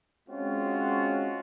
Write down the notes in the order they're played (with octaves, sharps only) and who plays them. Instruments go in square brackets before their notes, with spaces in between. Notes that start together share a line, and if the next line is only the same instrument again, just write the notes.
[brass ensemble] G#3 C4 C#4 F4 F#4